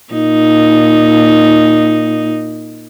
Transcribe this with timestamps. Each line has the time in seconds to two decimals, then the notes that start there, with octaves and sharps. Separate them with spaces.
0.13 A#2 D#4